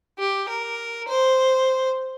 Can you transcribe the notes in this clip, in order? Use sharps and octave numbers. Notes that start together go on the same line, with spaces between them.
G4
A#4
C5